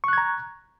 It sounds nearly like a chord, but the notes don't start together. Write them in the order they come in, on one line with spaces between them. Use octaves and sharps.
C#6 F#6 G#6 A#5